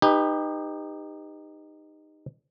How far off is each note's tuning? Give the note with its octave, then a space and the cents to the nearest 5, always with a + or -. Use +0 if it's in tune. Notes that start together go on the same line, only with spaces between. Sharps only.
D#4 -15 G4 +25 B4 +0